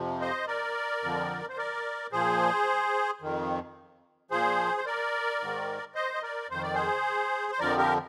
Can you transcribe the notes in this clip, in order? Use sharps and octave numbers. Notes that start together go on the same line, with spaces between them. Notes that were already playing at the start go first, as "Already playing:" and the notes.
Already playing: F2 C3 F3
C5 D#5
A#4 D5
F2 D3 F3
C5
A#4 D5
A#2 F3 G#4 C5
F2 D#3
A#2 F3 G#4 C5
C5
A#4 D5
G#2 D#3
C5 D#5
D#5
A#4 D5
F2 D#3 C5
D5
G#4 C5
C5
F2 D3 F3 A#4 D5
G4 A#4